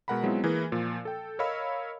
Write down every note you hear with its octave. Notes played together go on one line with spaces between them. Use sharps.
B2 G#3 A#4 F#5 A#5 B5
F#3 G#3 B3 C4 E4 F4
E3 A#3 E4 G#4 A#4 B4
A#2 F3
A4 G5
A#4 C#5 D#5 F5 B5 E6